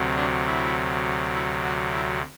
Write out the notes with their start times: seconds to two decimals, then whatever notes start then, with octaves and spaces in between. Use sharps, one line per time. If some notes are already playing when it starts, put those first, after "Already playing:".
Already playing: D2 C3 F#3
0.16 D4
0.46 E4
1.34 E4
1.64 F#4
1.93 E4